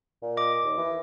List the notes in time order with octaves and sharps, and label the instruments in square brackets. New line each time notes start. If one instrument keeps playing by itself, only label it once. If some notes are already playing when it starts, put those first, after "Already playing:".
[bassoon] A#2
[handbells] D#5 D6
[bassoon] D#2
E3